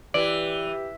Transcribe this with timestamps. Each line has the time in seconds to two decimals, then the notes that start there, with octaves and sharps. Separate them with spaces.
0.14 E3 G4 D5